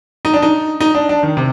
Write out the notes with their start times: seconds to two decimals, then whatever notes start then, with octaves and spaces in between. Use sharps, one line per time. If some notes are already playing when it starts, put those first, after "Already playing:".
0.25 D#4
0.33 D4
0.42 D#4
0.80 D#4
0.95 D4
1.09 D4
1.23 D#3
1.37 C3